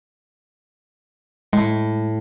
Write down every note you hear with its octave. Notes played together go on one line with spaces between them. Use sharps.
A2 G#3